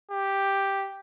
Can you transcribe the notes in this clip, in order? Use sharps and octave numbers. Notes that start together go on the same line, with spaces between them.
G4